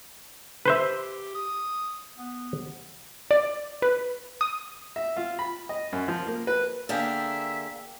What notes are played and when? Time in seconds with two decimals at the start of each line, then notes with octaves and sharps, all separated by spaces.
0.66 G4 B4 C5 E5
1.35 D#6
2.18 B3
3.31 D5
3.82 B4
4.41 D#6
4.96 E5
5.17 F4
5.39 B5
5.69 D#5
5.93 F#2
6.08 F3
6.27 A#3
6.47 B4
6.89 D3 A#3 G#4 E5 F5 G5 A5